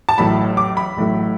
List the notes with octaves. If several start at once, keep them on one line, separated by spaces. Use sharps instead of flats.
A5
A1 A2 F#3 A3 B5
D6
B5
A1 A2 F#3 A3